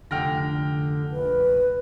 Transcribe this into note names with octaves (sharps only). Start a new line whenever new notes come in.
F1 D3 G5 F6 A#6
A#1 B4